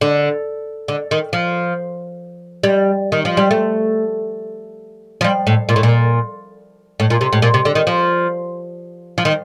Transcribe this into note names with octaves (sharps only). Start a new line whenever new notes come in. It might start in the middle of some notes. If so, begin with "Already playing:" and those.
D3
D3
D#3
F3
G3
D#3
F3
G3
A3
F3
G3
A2
A#2
A2
A#2
A2
A#2
C3
A2
A#2
C3
D3
D#3
F3
F3
D#3